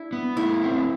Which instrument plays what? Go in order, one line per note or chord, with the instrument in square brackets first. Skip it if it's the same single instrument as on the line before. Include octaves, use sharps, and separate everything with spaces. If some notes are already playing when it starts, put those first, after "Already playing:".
Already playing: [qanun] D4 E4
[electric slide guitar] B3
[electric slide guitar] A3 [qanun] E4
[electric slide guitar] C4